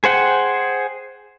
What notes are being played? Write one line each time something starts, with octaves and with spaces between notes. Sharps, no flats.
G#4 C5 F#5 G5